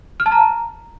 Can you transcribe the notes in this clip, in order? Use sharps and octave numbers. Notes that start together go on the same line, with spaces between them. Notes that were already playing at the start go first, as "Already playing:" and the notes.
F6
A5
A#5